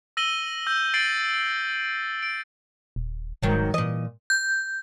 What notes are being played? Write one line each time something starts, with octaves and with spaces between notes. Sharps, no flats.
E6 A#6 D#7 F#7 G7
E6 G6
A6 C7 D7 F#7
D7
D#1
E1 G#2 D#3 F#3
A#2 E3 D#5
G6